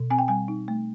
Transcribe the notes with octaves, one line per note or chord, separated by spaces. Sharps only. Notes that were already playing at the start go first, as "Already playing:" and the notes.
Already playing: B2
C4 G#5
G5
G3 G#5
D#4
A3